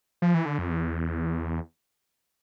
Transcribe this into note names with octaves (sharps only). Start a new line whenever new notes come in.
F3
E3
D3
F2
E2